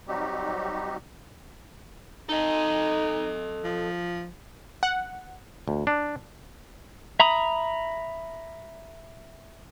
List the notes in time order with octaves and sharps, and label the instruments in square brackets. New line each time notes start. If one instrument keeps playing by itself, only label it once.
[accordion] F#3 G3 C4 D#4 F#4 G4
[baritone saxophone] D#4 [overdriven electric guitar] A4 D#5
[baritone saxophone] F3
[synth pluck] F#5
[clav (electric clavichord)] D2
D4
[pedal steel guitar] E5 A#5 B5 D#6